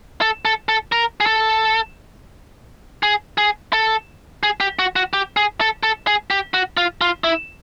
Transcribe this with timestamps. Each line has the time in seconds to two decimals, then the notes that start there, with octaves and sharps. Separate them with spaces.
0.21 A4
0.45 A4
0.69 A4
0.92 A#4
1.20 G#4
1.26 A4
3.03 G#4
3.38 G#4
3.73 A4
4.43 G#4
4.60 G4
4.79 F#4
4.96 F#4
5.13 G4
5.37 G#4
5.61 A4
5.83 A4
6.07 G#4
6.30 G4
6.54 F#4
6.77 F4
7.01 F4
7.24 E4